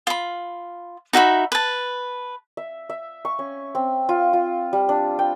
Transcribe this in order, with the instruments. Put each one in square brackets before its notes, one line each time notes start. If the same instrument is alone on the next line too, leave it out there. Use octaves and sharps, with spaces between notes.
[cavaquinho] F4 B5
D#4 F#4 E5 B5
B4 A5
[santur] E5
E5
C#6
C#4
C4
F4
F4
G3
D4
G5